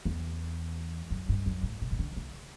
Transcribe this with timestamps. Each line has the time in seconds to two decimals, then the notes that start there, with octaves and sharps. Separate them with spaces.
0.05 E2
1.11 F#2
1.29 G2
1.46 F#2
1.63 A2
1.81 B2
1.91 C#3
1.99 D3
2.16 C#3